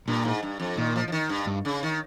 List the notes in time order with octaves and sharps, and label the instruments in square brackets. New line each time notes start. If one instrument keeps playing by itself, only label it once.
[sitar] G2 [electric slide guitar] A#2
[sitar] G#2
G2
F2
[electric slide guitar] A#2 [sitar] D#3
[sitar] F3
F3
D#3
G2
[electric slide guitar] G2
[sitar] C#3
D#3